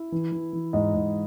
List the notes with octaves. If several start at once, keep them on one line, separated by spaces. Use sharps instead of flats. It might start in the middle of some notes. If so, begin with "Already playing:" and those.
Already playing: E4
E3
E3
E3
G#2 D#5
G#2